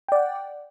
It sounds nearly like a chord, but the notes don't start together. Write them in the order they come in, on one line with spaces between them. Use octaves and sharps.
G5 D5 F#5